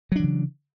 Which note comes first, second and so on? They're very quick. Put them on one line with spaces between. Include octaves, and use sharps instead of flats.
F#3 D4 E3 C#3